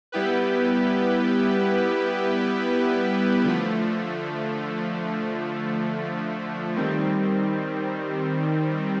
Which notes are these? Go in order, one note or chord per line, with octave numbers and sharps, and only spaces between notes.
G3 B3 E4 G4 B4
D3 F3 A3
D#3 G3 C4